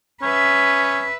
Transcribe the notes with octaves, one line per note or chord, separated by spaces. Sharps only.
C#4 B4 E5